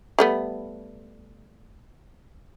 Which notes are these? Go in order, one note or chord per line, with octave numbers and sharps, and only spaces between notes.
G3 A3 B3